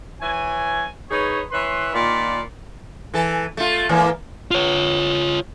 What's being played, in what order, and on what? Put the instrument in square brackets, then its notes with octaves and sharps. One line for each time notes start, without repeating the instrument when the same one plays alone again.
[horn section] E3 C#5 G#5
D#4 G#4 B4 C#5
E3 B4 C#5 C6
A#2 D#3 F4 D5 B5
[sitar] E3 A4
A3 F4
G#2 E3 A#3
[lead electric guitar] F4 C#5